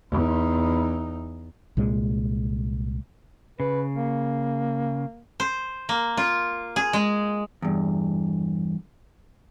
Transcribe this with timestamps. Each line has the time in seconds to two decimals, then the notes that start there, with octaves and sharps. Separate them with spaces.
0.11 E2 D#4
1.77 C2 A#2 G#3
3.60 C#3 B4
3.95 A#3
5.40 C5
5.89 A#3
6.17 F4
6.76 G#4
6.93 G#3
7.62 E2 G2